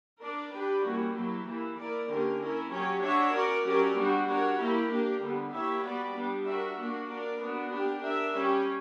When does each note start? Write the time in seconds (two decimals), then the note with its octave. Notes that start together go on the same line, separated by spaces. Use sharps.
0.20 D4 A#4 D5
0.51 D4 G4 B4 D5
0.82 E3 G3 A#3 C#4 F#4
1.14 F#3 A#3 E4 G4
1.45 E3 A#3 E4
1.76 A#3 E4 A#4 D5
2.08 D3 A#3 C#4 G4 A#4
2.40 C#4 E4 A#4
2.70 F#3 C#4 G4 C#5
3.02 D4 F#4 C#5 E5
3.32 C#4 F#4 A#4 D5
3.64 F#3 C#4 G4 A#4 D5
3.96 G3 B3 D4 F#4
4.27 D4 F#4 A#4 C#5
4.57 A#3 E4 G4 A#4
4.90 A#3 D4 G4 A#4
5.20 D3 G3 B3
5.52 A#3 E4 G4 C#5 E5
5.83 G3 B3 F#4 B4 D5
6.14 G3 B3 D4
6.45 D4 F#4 A#4 E5
6.76 A#3 D4 F#4
7.08 D4 A#4 D5
7.39 B3 D4 F#4
7.70 D4 G4 A#4
8.02 D4 A#4 E5
8.33 G3 C#4 G4